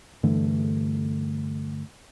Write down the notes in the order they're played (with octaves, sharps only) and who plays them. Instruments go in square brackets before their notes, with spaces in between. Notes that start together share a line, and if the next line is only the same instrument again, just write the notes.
[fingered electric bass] G2 D3 E3 A3